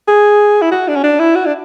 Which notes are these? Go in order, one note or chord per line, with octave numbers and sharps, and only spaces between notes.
G#4
E4
F#4
D4
C#4
D4
E4
F#4
D4